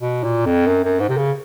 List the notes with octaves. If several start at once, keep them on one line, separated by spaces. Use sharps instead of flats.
B2
A#2
F2
F#2
F#2
G#2
C3
C#3